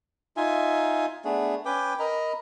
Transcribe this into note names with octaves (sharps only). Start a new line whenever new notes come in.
D#4 F4 E5 G#5
A3 B3 D4 G#4
C#4 B4 G5 D6
A#4 D#5 A#5 B5